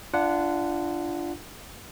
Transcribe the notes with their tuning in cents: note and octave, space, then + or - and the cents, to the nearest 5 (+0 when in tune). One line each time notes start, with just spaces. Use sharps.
D4 +0 F4 -30 F#5 +0